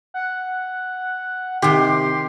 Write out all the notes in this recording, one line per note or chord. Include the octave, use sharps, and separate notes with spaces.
F#5
C3 D#3 G4 C6